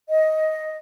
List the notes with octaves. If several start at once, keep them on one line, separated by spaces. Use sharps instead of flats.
D#5